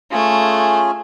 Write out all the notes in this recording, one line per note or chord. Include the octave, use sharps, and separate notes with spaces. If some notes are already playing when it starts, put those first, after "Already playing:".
A3 C#4 F4 G#4